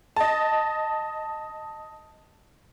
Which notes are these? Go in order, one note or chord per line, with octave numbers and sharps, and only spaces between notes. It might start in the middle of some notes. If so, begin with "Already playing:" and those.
D#5 A5